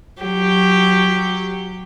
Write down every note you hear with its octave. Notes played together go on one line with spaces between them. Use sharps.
F#3 G4